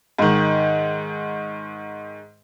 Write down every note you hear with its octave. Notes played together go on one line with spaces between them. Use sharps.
G#2 D#3